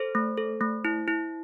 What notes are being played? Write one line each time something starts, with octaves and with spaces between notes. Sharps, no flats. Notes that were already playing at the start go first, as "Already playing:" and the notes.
Already playing: A4 C5
A3
A4
A3
E4
E4